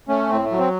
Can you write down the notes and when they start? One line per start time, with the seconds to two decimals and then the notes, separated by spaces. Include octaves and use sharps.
0.08 A3 C#4
0.30 A2 C4
0.44 A3
0.52 F#3
0.58 C4